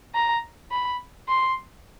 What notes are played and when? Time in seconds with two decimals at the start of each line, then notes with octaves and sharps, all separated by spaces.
0.15 A#5
0.71 B5
1.28 C6